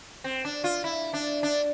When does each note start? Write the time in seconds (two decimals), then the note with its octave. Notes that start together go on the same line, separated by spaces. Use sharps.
0.24 C4
0.45 D4
0.64 F4
0.84 E4
1.13 D4
1.43 D4